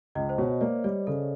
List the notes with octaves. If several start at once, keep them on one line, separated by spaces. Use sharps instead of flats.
C#2 D#5
C5
B2 C#5
A#3 D5
G3 D5
C#3 A4